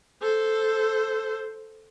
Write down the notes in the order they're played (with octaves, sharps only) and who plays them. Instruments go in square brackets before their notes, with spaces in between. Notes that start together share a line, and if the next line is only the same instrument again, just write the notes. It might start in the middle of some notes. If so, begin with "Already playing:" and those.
[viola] A4 C5